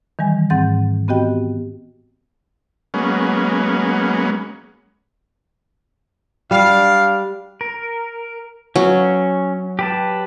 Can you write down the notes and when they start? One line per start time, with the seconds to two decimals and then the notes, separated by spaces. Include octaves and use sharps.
0.19 D#3 E3 G3 G#5
0.50 G#2 C4 F#5 G6 A6
1.08 B3 C4 F#4 G4 D#5 G5
2.94 F#3 G#3 A#3 B3 C#4
6.51 G3 D4 F5
7.61 A#4
8.76 F#3 C#4
9.79 G4 B4 A5